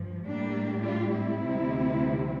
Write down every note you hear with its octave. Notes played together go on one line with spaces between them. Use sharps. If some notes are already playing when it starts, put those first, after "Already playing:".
Already playing: G2 F3
A2 G3 A#3 D4
D4 F4
C4 E4
D2 C3 E3 G3